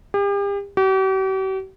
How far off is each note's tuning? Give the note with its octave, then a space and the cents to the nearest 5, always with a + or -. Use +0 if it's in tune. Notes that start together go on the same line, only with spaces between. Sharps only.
G4 +40
G4 -45